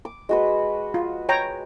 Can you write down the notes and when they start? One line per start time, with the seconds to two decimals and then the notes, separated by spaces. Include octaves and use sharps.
0.05 D6
0.29 G#3 F#4 B4
0.94 F4
1.29 C#5 G5 A#5